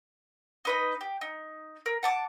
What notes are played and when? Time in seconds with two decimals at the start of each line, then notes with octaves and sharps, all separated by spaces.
0.65 D#4 B4 D#5
1.01 G4
1.21 D#4
1.86 A#4
2.03 F#5 A5 D6